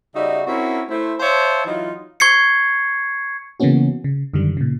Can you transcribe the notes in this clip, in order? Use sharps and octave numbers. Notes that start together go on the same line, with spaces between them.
C#3 G3 D#4 F#4 E5
C4 C#4 E4 F#4 A#4
A3 E4 C5
C5 C#5 E5 F5 A5
E3 F#3 D#4 F4
C#6 G#6 C7 C#7
C#3 E3 A#3 B3 C#4 F#4
C#3
F#2 D3 D#3 G3
A#2 C#3